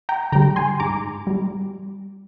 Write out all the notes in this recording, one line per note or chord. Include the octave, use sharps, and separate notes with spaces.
G5 A#5
D3 G3 G5 A#5
G#5 C6
G#2 A#5 D6
G3